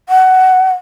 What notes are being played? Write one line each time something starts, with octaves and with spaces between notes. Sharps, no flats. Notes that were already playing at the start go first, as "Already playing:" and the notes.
F#5